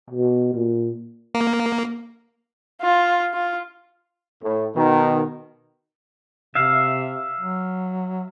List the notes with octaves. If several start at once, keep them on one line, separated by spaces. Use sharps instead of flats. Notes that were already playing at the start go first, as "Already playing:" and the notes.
B2
A#2
A#3
F4
F4
A2
B2 D#3
C3 E5 F5
F#3